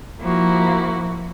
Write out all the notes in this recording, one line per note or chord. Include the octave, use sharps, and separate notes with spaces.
F3 A#3 E4 F#4